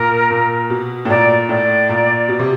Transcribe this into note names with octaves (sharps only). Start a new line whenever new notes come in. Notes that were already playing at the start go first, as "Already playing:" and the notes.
Already playing: A#2 A#4
A#2
B2
A2
A#2 D5
A2 D5
A#2
B2
C3